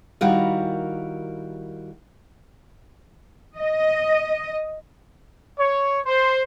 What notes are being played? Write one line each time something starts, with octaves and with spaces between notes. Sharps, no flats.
D#3 G3 E4 F#4 A#4 F5
D#5
C#5
C5